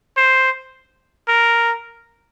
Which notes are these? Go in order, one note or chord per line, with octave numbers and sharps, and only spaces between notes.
C5
A#4